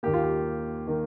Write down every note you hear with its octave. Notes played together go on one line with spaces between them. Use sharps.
D#2 D#3 A#3 G4
F4
G4
D#3 A#3